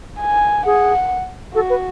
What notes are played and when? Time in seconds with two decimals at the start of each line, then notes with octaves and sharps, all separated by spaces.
0.20 G#5
0.66 G#4 F#5
1.55 F#4 A4
1.70 B4